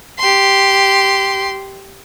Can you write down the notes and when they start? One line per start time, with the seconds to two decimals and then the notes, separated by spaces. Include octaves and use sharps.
0.19 G4 C6